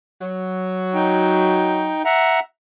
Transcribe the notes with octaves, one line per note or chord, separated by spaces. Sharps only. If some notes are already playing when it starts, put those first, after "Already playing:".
F#3
D#4 G5
E5 F#5 A#5